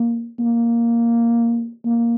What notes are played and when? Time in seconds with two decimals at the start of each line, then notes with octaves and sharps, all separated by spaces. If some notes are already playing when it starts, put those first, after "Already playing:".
Already playing: A#3
0.40 A#3
1.85 A#3